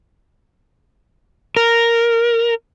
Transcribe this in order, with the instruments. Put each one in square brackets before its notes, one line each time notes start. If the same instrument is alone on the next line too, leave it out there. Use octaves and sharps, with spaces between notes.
[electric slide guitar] A#4